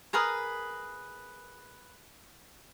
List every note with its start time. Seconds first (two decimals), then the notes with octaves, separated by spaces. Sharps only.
0.13 G#4 A#4 B4 D#6